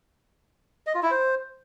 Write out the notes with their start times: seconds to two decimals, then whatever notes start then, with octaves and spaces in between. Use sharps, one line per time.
0.87 D#5
0.95 F4
1.03 E4
1.11 C5